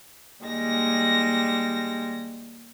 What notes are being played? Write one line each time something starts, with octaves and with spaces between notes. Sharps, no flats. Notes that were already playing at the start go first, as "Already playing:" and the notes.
D#2 G3 G#3 A#6